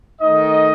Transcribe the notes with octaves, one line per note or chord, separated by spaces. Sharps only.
D#3 A3 D#4 D#5